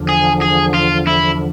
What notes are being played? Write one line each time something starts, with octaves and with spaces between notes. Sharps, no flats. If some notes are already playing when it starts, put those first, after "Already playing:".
Already playing: E2 D3 F3
G#4
G#4
F4
E4